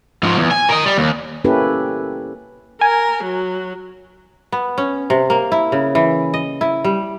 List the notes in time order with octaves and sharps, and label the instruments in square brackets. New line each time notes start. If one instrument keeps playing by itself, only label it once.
[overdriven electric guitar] G#2 F3
E2
G#5
A#4 D#5
G3
D#2
[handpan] A#3 C#4 E4 G4 A4 B4
[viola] A#4 [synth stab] G#5
[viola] F#3
[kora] B3
C#4
C3
A#3
E4
C#3
E3
D#5
E4
G3